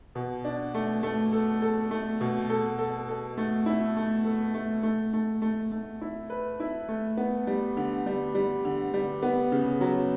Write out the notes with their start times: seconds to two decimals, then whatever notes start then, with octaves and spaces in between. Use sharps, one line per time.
0.15 B2
0.44 D4
0.74 A3
1.03 A3
1.33 A4
1.62 A4
1.91 A3
2.21 B2
2.50 A4
2.79 A4
3.09 A4
3.37 A3
3.66 E4
3.97 A3
4.25 A4
4.54 A3
4.83 A3
5.13 A3
5.42 A3
5.72 A3
6.02 E4
6.30 B4
6.60 E4
6.89 A3
7.17 B3
7.47 G3
7.77 D3
8.06 G3
8.35 G3
8.65 D3
8.94 G3
9.23 B3
9.52 C#3
9.81 F#3